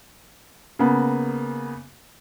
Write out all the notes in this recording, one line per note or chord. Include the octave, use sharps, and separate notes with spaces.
C#3 A#3 B3